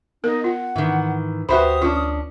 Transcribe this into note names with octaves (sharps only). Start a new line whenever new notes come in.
B3 D#4 A#4
F4 F#5
G#2 D#3 E3
D2 F#4 G4 B4 C5 E5 B5 D#6
C#4 D4 F4